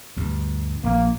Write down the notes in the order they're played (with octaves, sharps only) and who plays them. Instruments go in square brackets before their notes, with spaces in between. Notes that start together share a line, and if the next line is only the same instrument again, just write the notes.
[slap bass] D2 G2
[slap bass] A#1 [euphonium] A#3